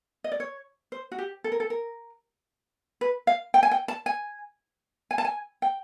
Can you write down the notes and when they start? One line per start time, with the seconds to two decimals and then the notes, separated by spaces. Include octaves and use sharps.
0.24 D#5
0.32 D5
0.40 C#5
0.92 C5
1.12 F#4
1.18 G4
1.44 A4
1.52 A#4
1.60 A4
1.70 A#4
3.01 B4
3.27 F5
3.54 G5
3.63 G#5
3.71 G5
3.88 A5
4.06 G#5
5.11 G#5
5.18 A5
5.25 G#5
5.62 G5